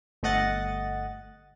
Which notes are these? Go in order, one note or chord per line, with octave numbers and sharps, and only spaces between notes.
G1 A3 D#5 F#5 A6